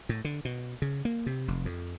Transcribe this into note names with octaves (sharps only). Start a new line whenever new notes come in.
A2
D3
B2
C#3
A#3
C3
F1
F2